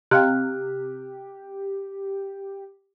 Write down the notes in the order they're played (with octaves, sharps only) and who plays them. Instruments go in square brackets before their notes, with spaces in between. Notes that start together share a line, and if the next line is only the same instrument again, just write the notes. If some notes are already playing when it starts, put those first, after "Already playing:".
[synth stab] C3 [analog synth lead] G4 [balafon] D#5 F5 G5 [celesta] F6 F#6